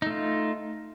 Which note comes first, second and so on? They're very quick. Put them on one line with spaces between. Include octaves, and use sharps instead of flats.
D#4 A3 F4